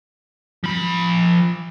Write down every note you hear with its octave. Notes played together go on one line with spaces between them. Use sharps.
F3 B5